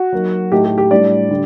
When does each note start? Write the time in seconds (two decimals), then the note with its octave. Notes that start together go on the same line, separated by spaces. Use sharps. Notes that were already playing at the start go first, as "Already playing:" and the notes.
Already playing: F#4
0.13 F#3 A#3 D#4
0.51 A2 A3 D#4 G4
0.65 G4
0.78 G4
0.90 A2 G3 D4 D5
1.30 D3 G3